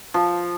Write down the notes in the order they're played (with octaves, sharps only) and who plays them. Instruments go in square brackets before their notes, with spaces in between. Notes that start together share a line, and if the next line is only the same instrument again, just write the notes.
[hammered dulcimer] F3